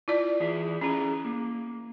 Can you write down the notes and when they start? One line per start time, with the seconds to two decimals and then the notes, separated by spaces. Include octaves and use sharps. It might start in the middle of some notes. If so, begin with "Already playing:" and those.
0.08 E4 F4 D5
0.40 E3 G#4 E5
0.81 C#4 E4 G#4 E5 A#5
1.25 A#3